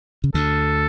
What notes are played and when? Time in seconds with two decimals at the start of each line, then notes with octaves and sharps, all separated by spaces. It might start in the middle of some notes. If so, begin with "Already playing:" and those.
0.24 C#3
0.34 D2 D3 A4